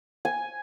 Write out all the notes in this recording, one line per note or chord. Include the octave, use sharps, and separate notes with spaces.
G#5